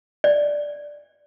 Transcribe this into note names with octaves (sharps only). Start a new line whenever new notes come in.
D5